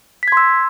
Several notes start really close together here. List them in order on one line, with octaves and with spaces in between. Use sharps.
B6 G#6 C6 E6